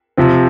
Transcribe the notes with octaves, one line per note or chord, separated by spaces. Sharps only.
C3 F3 C4